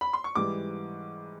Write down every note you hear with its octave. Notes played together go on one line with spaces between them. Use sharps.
B5
C6
C#6
G#2 E3 G3 D6